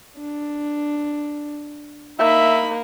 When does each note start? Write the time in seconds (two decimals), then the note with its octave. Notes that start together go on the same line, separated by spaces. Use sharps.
0.18 D4
2.19 A#3 D#4 E5 B5